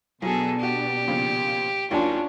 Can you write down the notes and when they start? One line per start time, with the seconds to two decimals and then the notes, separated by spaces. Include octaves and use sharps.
0.22 B1 B2 F#3 B3 D4 G#4 A4
0.60 F#4 G4 D#7
1.07 A#2 C#3 F3
1.91 D#2 D#3 F#3 C#4 D4 F4